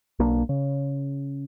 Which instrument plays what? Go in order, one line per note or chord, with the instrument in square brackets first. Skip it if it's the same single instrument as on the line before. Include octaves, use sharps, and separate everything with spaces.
[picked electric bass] B1 A#3 D4
C#3